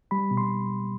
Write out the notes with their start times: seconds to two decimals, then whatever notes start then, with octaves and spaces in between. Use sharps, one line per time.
0.11 G3 B5
0.31 B2
0.37 C6